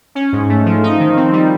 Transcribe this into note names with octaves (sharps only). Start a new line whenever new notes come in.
C#4
G#2
A3
F3
D#4
D#3
C4
G3